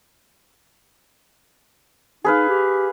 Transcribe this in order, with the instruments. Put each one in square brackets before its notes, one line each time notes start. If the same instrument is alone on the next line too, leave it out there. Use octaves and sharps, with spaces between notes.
[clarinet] D#4 [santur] G#4 B4 F5
[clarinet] G4